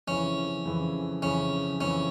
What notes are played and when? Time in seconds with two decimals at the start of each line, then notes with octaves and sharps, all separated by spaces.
0.07 F2 C#3 E3 C#4
0.65 F2 C#3 E3
1.22 F2 C#3 E3 C#4
1.80 F2 C#3 E3 C#4